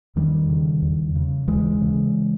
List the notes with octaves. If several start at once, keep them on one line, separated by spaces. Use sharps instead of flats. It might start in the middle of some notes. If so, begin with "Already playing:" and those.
E2 D#3 G3
C#3
E2
C#3
D#2 E3 G#3
C#3